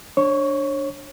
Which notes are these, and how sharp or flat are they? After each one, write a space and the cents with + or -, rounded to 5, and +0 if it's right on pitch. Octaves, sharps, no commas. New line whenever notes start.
D4 +0 C#5 -30 C#6 +20